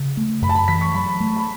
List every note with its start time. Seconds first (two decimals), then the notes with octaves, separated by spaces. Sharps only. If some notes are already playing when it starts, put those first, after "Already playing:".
Already playing: C#3
0.17 A3
0.42 F#2 B5
0.49 A5
0.55 B5
0.68 E3 B6
0.81 C#6
0.94 F#3 B5
1.20 A3
1.37 B5